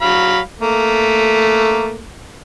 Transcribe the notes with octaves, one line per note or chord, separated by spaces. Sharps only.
F#3 F5 B5
A3 A#3